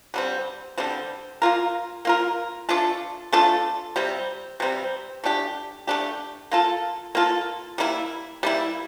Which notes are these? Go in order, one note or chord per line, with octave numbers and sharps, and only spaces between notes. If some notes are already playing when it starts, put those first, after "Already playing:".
D3 G3 C4
D3 G3 C4
A#3 F4 A#4
A#3 F4 A#4
A3 D4 F4 A4
A3 D4 F4 A4
C3 G3 C4
C3 G3 C4
A3 D4 G4
A3 D4 G4
A#3 F4 A4
A#3 F4 A4
G3 A#3 E4
G3 A#3 E4